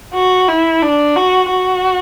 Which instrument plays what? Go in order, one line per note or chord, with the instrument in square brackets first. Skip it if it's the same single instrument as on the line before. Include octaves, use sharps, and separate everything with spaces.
[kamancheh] F#4
E4
D4
F#4
F#4